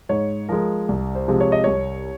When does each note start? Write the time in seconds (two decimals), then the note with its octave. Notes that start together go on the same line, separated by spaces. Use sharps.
0.09 G#2 C#5
0.49 F3 G#3 A#4
0.89 C2
1.15 C5
1.28 C3 F3 G#3
1.40 C#5
1.52 D#5
1.64 C2 C#5